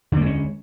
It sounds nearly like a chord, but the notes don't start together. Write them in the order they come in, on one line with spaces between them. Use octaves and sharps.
D3 A#3 G#3 C#4